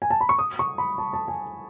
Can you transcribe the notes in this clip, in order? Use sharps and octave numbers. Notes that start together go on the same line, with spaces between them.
G#5
A5
B5
C#6
D#6
C#6
B5
A5
A5
G#5